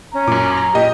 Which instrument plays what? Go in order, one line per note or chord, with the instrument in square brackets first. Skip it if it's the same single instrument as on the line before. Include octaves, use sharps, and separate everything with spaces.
[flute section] C#4 A#5
[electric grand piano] F#2 D6 [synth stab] A#2
[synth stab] A#5
[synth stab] A#2 [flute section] G4 [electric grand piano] D#5